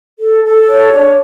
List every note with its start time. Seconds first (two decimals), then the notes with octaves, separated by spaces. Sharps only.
0.20 A4
0.44 A4
0.67 C#5
0.92 D4